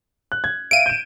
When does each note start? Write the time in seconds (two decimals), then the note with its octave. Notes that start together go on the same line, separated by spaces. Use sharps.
0.32 F#6
0.44 G#6
0.71 E5 F5 D7 D#7
0.86 G6 E7